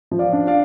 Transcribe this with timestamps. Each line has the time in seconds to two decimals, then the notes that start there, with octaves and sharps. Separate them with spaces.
0.11 F3
0.19 D5 F5
0.33 D4
0.47 D5 F5